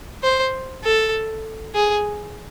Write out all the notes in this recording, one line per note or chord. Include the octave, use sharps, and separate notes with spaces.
C5
A4
G#4